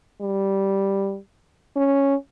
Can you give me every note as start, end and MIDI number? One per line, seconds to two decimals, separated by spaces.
0.22 1.18 55
1.76 2.15 61